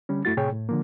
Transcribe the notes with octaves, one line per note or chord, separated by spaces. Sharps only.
D3 G3 C#4
F#2 A3 E4 F#4 A6
A2 C3 G#4 C#5 G5
A2
D3 F3 A#3